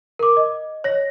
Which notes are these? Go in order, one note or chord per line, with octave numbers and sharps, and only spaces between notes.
A#4 D6
D#5
C#5 A#6